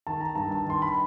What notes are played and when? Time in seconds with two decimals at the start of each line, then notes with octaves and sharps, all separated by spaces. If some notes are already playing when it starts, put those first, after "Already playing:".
0.07 D#3 A5
0.20 A#5
0.36 G2 A5
0.51 A5
0.65 D#3 C6
0.82 B5